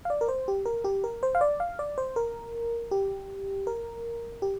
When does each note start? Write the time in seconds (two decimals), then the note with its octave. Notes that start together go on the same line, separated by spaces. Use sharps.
0.05 F5
0.10 D5
0.21 A#4
0.28 C5
0.48 G4
0.65 A#4
0.84 G4
1.04 A#4
1.23 C5
1.35 F5
1.41 D5
1.60 F5
1.79 D5
1.98 C5
2.16 A#4
2.91 G4
3.67 A#4
4.42 G4